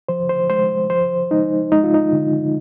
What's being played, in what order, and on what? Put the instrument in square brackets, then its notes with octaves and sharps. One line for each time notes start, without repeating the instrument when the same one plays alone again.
[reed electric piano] F3 C5
C5
G#3 C5
F3 C5
G#3 D#4
G#3 D#4
F4
D#4
D3